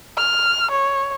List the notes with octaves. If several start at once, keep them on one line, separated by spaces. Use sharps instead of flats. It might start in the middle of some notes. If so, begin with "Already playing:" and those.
F6
C#5